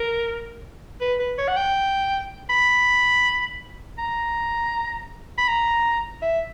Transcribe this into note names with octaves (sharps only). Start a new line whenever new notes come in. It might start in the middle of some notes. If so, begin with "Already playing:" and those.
Already playing: A#4
B4
B4
C#5
F#5
G5
B5
A#5
B5
A#5
E5